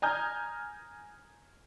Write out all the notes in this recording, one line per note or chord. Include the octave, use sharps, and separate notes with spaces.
G#5 A#5 D#6 F6 G6 G#6